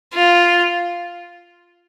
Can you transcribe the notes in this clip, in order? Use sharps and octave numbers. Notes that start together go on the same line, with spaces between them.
F4